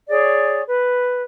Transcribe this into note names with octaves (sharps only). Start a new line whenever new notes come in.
G#4 C#5 D5
B4